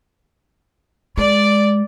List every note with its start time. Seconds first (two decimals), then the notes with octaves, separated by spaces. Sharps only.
1.17 G#3 D5